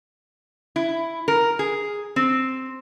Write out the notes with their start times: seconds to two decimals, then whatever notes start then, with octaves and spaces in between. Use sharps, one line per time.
0.76 E4
1.28 A#4
1.59 G#4
2.16 C4